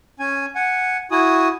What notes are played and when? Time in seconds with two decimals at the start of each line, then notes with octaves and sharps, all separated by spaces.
0.19 C#4 G#5
0.55 F#5 G#5
1.11 E4 F#4 G#5 D#6